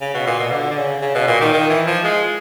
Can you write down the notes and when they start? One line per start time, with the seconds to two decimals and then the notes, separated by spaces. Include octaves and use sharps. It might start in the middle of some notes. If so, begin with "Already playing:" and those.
0.01 C#3
0.14 B2
0.27 A#2
0.40 B2
0.51 D3
0.70 D3
0.77 C#3
1.02 C#3
1.15 B2
1.27 A#2
1.41 D#3
1.53 D#3
1.70 E3
1.86 F3
2.04 G#3